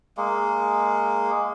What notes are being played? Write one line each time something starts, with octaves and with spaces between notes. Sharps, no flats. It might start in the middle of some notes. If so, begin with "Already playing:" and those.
G#3 A#3